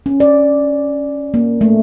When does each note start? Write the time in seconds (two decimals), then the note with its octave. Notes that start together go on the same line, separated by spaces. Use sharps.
0.06 C#4
0.20 D5
1.34 A#3
1.61 A3